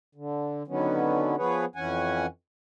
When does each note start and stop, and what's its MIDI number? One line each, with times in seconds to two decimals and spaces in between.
0.15 0.63 50
0.68 1.35 50
0.68 1.35 51
0.68 1.35 54
0.68 1.35 59
0.68 1.35 61
1.37 1.65 53
1.37 1.65 59
1.37 1.65 68
1.37 1.65 71
1.37 1.65 73
1.76 2.26 41
1.76 2.26 52
1.76 2.26 61
1.76 2.26 78
1.76 2.26 80